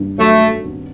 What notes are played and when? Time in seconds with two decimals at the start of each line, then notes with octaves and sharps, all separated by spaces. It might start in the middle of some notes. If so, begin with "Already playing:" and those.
Already playing: G2
0.18 F#3 A3
0.64 C4